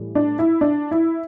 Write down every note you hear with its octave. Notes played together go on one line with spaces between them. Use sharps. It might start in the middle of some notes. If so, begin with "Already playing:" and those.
Already playing: A2 E3 G3
D4
E4
D4
E4